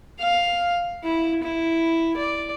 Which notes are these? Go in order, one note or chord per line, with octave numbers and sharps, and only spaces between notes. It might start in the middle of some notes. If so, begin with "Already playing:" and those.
F5
E4
E4
D5